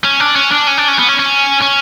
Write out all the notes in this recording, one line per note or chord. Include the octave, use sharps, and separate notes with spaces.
C#4
D4
C#4
D4
C#4
D4
C#4
B3
C#4
C#4
C#4